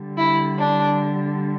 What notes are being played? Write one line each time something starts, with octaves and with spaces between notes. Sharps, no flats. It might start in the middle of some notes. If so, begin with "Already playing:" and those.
Already playing: D3 G3
E4
D4